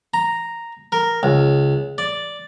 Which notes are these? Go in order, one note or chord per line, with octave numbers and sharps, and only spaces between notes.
A#5
A#4
C#2
D5